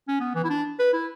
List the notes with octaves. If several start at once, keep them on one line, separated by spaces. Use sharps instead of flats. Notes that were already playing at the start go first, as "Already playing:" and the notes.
C#4
B3
E3
E4
D4
B4
E4